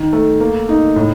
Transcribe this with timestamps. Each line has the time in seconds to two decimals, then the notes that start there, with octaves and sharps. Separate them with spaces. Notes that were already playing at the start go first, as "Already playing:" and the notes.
Already playing: D#3
0.13 A3
0.40 A#3
0.69 D#4
0.96 A2